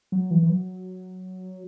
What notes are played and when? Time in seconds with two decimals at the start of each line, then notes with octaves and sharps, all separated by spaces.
0.12 F#3
0.31 E3
0.43 E3
0.49 F#3